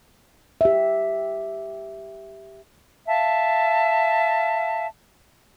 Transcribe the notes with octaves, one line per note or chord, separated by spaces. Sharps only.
G4 E5
E5 F5 A5